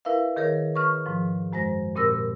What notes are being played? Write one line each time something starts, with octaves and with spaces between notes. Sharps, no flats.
E4 A#4 B4 E5 F5
D#3 G#4 A#4 C#5
B4 C#6 F6
G#2 F3
F#2 G#3 C5 A#6
G2 A#2 C4 A#4 E6 A#6